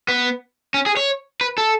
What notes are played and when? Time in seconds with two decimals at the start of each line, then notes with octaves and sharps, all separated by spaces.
0.08 B3
0.74 C#4
0.86 G#4
0.97 C#5
1.41 B4
1.58 A4